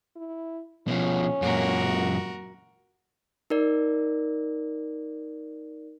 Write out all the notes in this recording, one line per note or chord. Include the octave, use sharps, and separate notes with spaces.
E4
B2 F3 C#4
F#2 A#2 F#4 A#4
D#4 A#4 D5